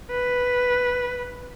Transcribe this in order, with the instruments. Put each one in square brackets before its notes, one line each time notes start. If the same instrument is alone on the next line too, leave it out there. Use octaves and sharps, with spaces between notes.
[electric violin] B4